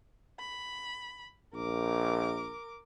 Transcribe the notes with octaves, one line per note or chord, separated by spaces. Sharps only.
B5
A#1 A#4 D6